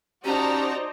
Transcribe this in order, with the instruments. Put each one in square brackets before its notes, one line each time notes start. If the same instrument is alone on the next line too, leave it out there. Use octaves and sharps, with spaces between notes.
[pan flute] C#4 [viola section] D#4 C5 D5 [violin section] F#4 A5 A#5 [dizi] G4